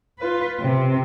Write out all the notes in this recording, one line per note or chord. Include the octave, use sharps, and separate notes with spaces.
F4 B4
C3